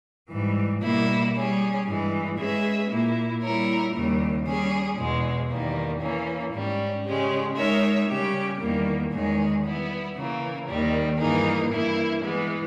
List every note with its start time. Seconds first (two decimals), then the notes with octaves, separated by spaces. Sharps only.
0.31 G#2 E3 G3
0.82 B2 G3 A#3 E4
1.34 G3 C#4 G#4
1.86 G2 E3 G#3
2.38 G#3 C#4 G#4 B4 E5
2.90 A#2 A#3 E4
3.42 G3 A#3 E4 A#4 C#5
3.94 D#2 C#3 G3
4.46 G3 C#4 G#4
4.97 E2 B2 G#3
5.50 E2 D#3 G3 A#3
6.01 E3 A#3 C#4
6.54 G#2 G3 C#4
7.05 C#3 G#3 C#4 G4
7.57 G#3 D#4 A#4 C#5 E5
8.09 C#3 G3 C#4 G4
8.60 E2 D#3 G3 A#3
9.12 E2 D#3 G#3 C#4 G#4
9.64 G3 B3 E4
10.17 C#3 E3 A#3
10.68 D#2 D#3 G3
11.20 G2 E3 A#3 D#4 G#4
11.72 G2 E3 A#3 E4
12.24 E3 G#3 B3